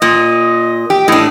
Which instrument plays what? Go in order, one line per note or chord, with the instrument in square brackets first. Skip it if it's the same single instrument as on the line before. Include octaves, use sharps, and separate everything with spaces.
[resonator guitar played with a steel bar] A#2 [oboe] D#5
[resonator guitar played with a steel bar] G4
[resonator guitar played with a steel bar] A2 D4 [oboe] D#5